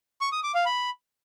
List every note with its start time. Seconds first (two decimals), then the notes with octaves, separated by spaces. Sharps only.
0.21 C#6
0.32 D#6
0.43 D6
0.55 F5
0.66 B5